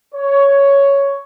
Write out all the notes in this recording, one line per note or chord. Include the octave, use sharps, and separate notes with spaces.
C#5